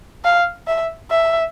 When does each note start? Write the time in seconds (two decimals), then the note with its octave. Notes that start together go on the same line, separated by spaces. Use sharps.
0.25 F5
0.67 E5
1.11 E5